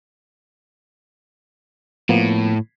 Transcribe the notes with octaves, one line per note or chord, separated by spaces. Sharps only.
A2 F3 A#3 B3